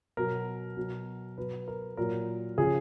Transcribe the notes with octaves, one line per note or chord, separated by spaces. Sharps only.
B2 F#3 A#4
B2 F#3
B2 F#3 B4
A#4
A#2 F#3 A#4
C#3 F3 G#4